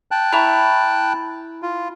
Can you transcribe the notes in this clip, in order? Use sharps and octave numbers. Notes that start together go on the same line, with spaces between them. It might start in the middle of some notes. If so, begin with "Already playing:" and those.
G5 A5 F#6
E4 A#5 C#6
F4